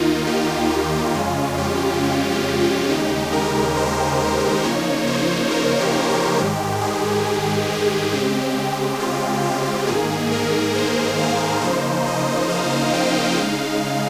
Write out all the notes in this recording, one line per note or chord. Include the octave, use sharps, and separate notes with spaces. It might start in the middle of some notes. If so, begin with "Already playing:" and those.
Already playing: D#2 D#3 A#3 D#4 F4
G4
F4
F2 C#3 G#3 C#4 F4
G4
G4
F4
G4
D#2 C#3 G#3 D#4 G4
A#4
C5
C5
C#3 F3 A#3 D#4 C#5
C5
A#4
G4
G4
G#2 D#3 G#3 G4
G#4
G4
G#4
C#3 G#3 C4 G4
F4
G4
G#2 D#3 A#3 G#4
A#4
C5
F5
C#3 F3 A#3 D#4 C5
D#5
F5
G5
C#3 G#3 D#4 F5